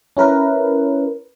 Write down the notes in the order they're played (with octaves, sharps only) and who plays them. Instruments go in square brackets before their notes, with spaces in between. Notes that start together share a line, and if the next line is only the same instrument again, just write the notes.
[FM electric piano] C#4 E4 A#4 B4